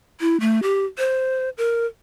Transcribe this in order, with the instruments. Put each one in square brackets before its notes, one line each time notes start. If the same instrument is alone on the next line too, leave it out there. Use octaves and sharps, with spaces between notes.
[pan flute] E4
A3
G4
C5
A#4